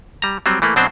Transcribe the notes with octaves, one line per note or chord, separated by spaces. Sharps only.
G3 A#5
F#3 G3 C4
E3 A3 A#3
B2 F#3 C4 D4 C5